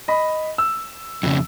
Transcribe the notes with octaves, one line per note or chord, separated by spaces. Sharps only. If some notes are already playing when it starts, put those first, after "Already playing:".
D#5 B5
E6
F2 C#3